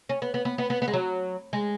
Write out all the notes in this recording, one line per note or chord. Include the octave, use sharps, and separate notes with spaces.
C#4
B3
B3
B3
B3
B3
B3
G#3
F#3
G#3